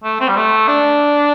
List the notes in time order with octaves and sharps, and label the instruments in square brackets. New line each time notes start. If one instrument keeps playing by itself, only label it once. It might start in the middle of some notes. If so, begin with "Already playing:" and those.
[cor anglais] A3
C4
G3
A3
D4